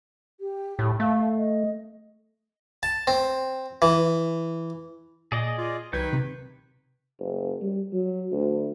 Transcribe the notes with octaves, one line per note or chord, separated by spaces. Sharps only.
G4
A2
A3 F5
D#5
A5
C4
E3
A#2 G#4 D5 D#5
F4
C2 D#3 F#3 B4 G6 G#6
C3
F#1
G3
F#3
D2